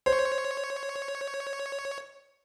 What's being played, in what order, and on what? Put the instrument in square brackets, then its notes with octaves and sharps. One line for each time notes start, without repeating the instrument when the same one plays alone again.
[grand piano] C5 [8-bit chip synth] C#5